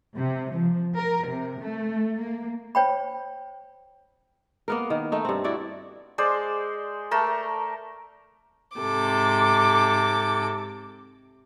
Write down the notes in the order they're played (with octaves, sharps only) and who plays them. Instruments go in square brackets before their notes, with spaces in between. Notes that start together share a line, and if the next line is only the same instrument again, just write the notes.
[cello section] C3
F3
A#4
C3
A3
A#3
[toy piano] C5 C#5 G5 B5
[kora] A#3 B3 A#4
D#3
A3 D#4
G2 C4
E4 F#4 D5
[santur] G#3 C5 D5
A3 A#4 A5
[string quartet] G#2 C3 A4 D6